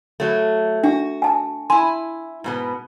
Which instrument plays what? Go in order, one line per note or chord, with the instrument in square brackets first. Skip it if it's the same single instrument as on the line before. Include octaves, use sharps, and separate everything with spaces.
[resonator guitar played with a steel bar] F#3 A3
[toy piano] D4 [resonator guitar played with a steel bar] F#4
[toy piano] G#5 A5
[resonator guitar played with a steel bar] E4 G#5 [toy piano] C6
[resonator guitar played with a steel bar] G#2 B2 B3